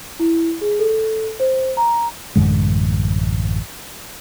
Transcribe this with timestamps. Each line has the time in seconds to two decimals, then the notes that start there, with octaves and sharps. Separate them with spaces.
0.19 E4
0.61 G#4
0.80 A4
1.40 C5
1.77 A#5
2.36 A1 F#2 D3 G#3